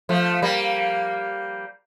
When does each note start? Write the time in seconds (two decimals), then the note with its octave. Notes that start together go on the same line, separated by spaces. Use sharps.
0.09 F3 A3
0.42 G3 A#3